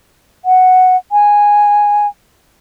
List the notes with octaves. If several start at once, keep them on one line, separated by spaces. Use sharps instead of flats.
F#5
G#5